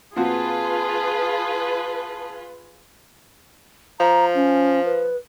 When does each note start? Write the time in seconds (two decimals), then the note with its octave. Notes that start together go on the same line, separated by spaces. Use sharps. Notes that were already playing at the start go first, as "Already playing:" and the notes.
0.16 A#2 C4 F4 F#4 G#4 B4 A5
4.00 F3 A#5
4.34 C#4
4.85 B4